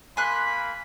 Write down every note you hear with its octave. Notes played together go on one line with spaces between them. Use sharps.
A#3 G#5 B5 C6 F#6